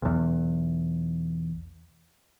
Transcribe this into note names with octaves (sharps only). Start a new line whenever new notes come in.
B1 E2